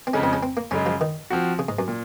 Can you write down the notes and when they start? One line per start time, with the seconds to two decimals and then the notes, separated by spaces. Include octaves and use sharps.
0.07 C4
0.14 F2 C#3 G#3 C#4
0.23 C4
0.33 C#4
0.43 C4
0.57 A#3
0.71 F#2 C#3 G#3 C#4
0.86 F3
1.01 D#3
1.30 F3 C4 F#4
1.59 C#3
1.69 G#2
1.79 F#2
1.88 A#2